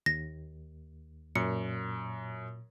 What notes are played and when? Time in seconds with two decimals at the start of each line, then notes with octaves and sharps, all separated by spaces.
0.06 D#2 A#6
1.35 F#2 A#2 C#7